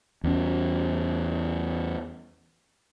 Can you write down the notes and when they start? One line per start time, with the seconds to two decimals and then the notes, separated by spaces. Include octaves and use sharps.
0.24 E2 C#4